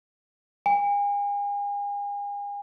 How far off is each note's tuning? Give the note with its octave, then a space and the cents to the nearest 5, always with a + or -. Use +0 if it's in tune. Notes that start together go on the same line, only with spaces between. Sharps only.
G#5 -40